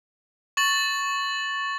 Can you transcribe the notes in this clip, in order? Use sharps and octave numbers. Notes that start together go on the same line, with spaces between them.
C#6 A6 F#7